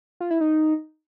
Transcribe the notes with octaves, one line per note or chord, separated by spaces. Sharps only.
F4
E4
D#4